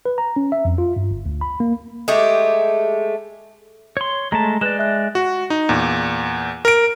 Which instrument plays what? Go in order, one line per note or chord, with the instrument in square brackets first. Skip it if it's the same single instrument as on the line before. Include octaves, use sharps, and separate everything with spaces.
[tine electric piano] B4
A#5
C#4
E5
F2
F4
G2
G1
D2
B5
A#3
[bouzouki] G#3 A3 G4
[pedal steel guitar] C#5 C6
[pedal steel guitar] G#3 A3 A5 [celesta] A#5
[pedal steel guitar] G#3 D5 [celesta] B4 F#6 E7
[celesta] E5 F#6
[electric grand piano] F#4
D#4
E2 A#2
A#4 D7